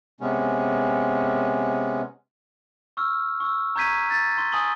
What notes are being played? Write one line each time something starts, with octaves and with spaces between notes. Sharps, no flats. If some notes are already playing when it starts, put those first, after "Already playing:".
C3 G#3 B3 C#4
C#6 E6 F6
C#6 E6
A#5 C#6 G6 G#6 B6 D#7
A6
C6 G7
G#5 A5 D#6 F#7 G7